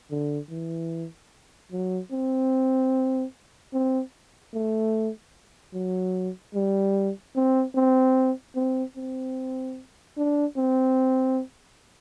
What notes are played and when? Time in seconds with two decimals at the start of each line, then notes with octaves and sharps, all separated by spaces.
0.11 D3
0.50 E3
1.72 F#3
2.12 C4
3.73 C4
4.54 A3
5.74 F#3
6.55 G3
7.36 C4
7.75 C4
8.56 C4
8.97 C4
10.18 D4
10.57 C4